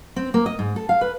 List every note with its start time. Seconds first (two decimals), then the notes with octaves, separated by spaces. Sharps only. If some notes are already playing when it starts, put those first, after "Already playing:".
0.16 C4
0.34 A#3
0.46 D#5
0.59 G#2
0.76 A4
0.89 F5
1.01 B4